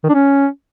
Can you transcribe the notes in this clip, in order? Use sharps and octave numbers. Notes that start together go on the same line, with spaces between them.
D#3
D4
C#4